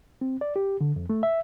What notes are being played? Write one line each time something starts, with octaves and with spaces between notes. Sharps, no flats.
C4
D5
G4
D3
F2
A3
E5